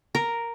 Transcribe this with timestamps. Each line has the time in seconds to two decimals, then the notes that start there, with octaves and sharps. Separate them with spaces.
0.15 A#4